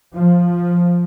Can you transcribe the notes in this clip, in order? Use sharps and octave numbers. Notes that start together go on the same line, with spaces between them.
F3